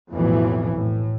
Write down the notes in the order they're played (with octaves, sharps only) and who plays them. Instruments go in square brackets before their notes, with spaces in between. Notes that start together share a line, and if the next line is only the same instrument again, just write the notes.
[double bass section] B1 F2 A2 E3
A2